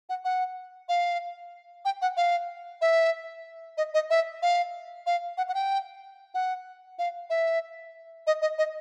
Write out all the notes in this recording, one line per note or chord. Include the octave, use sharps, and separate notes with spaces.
F#5
F#5
F5
G5
F#5
F5
E5
D#5
D#5
E5
F5
F5
F#5
F#5
G5
F#5
F5
E5
D#5
D#5
D#5